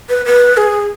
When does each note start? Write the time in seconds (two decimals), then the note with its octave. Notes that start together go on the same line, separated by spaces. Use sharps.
0.09 B4
0.26 B4
0.57 G#4